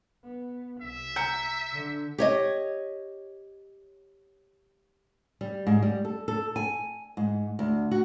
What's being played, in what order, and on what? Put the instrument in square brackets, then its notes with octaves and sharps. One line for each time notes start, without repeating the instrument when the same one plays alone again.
[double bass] B3
[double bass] C2 [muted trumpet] E5
[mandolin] A#5 [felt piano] G6 C#7
[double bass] D3 D4
[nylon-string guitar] G4 C#5 D#5
G3
G#2
G3
A4
A4
G#5
G#2
D2
F#4